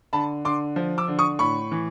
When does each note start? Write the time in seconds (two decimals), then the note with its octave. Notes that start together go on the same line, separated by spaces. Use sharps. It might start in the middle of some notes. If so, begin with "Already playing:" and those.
0.13 D3 A5 B5
0.45 D3 C6 D6
0.76 F3
0.98 D6 E6
1.08 D3
1.19 C#6 D#6
1.39 A2 B5 C#6
1.72 E3